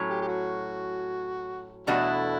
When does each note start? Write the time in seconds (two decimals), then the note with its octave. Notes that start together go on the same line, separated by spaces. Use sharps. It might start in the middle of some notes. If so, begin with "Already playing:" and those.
Already playing: A2 F#3 C#4
0.10 G4
0.22 G4
0.28 F#4
1.87 E2 B2 G3 A3 D4 E4 F#4